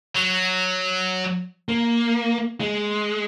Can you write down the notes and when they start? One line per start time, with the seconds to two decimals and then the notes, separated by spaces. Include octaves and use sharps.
0.15 F#3
1.69 A#3
2.60 G#3